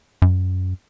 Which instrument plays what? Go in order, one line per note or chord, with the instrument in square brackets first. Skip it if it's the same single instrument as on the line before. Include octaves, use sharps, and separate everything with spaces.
[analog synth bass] F#2